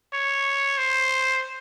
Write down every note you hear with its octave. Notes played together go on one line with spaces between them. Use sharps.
C#5
C5